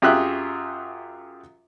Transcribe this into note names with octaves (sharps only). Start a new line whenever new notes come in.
F#2 F4 G4 G#4 E5 F#6